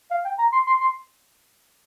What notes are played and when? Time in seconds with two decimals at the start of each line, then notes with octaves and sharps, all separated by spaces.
0.11 F5
0.25 G5
0.39 A#5
0.53 C6
0.67 C6
0.81 C6